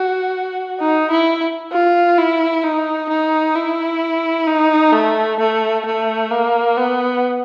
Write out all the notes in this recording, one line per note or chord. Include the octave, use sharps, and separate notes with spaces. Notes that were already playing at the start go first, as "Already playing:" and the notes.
Already playing: F#4
D#4
E4
F4
E4
D#4
D#4
E4
D#4
A3
A3
A3
A#3
B3